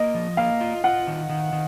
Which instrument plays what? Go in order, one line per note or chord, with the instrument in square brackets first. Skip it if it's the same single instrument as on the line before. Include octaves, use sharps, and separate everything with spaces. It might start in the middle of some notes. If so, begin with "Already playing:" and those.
Already playing: [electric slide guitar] A#3 [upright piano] D#5
[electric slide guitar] F3
[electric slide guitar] A#3 [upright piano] F5
[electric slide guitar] F4
[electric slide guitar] F4 [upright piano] F#5
[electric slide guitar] D#3
D#3
D#3